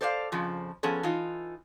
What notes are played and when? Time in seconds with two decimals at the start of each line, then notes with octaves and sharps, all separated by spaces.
0.01 A4 C5 D5 E5 F5
0.32 F2 C#3 F3
0.83 F3 B3 C#4 G#4 A4
1.03 E3 D#4 F4